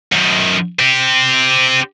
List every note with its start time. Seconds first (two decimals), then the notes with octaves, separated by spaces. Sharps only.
0.13 F#2 D#3
0.79 C4 G4